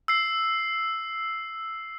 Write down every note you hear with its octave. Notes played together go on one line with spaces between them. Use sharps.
E6 C7